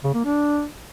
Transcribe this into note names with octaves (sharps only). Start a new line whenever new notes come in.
C#3
A#3
D4